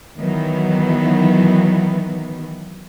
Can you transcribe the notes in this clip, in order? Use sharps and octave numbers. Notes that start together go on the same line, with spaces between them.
D#3 E3 F#3 B3